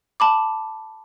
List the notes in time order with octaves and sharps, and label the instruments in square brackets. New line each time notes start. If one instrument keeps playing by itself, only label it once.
[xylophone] A5 B5 D6